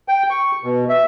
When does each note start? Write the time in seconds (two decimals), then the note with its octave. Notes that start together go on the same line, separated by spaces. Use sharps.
0.08 G5
0.30 C#6
0.64 B2
0.89 E5